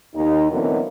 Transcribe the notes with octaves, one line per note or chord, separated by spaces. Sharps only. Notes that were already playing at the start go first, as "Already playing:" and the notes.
D#2 D#4
B2 D3 E3 F#3 A#3 C4